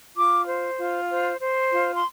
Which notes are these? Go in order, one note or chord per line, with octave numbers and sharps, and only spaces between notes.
F4 D6
C5
F4
C5
C5
F4
C6